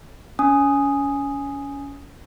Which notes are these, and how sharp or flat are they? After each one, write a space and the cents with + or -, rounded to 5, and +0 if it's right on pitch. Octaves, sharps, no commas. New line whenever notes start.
C#4 +25 G#5 +0 D#6 +0